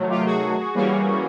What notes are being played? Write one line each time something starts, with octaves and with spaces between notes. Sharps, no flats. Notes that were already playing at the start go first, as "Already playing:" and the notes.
Already playing: C3 D#3 F#3 A3
F4 G4
F#4 G#4
E3 G3 A#3 C#4